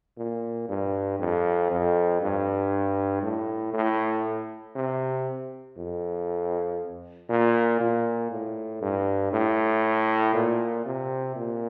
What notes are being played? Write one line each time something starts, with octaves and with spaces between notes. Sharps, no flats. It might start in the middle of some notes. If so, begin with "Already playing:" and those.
A#2
G2
F2
F2
G2
A2
A2
C3
F2
A#2
A#2
A2
G2
A2
A#2
C3
A#2